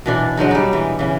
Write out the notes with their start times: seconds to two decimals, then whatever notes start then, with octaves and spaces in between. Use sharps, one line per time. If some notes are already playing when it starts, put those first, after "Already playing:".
0.06 B2 E3 D4
0.37 D3 F#3 G#3 D#4
0.51 G3 D#4
0.73 E3
0.99 C#3 E3